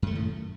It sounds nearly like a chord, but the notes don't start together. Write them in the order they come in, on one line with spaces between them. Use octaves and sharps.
F#2 A3 D#3 A2